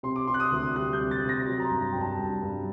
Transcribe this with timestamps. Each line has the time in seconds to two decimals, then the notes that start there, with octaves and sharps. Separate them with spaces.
0.03 C3 C6
0.16 D6
0.27 C3 C6
0.34 F#6
0.40 D#6
0.52 D2
0.76 G3 F#6
0.93 G6
1.00 C3
1.11 A6
1.23 C3
1.29 A#6
1.47 F#3
1.60 A#5
1.65 C6
1.71 G2
1.92 G2 G5
2.01 A5
2.19 G2
2.43 G2